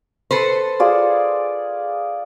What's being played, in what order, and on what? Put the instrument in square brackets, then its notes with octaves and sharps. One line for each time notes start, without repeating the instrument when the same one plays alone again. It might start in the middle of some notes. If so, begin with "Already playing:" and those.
[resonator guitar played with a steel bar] A4 B4 C5
[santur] F4 G#4 D5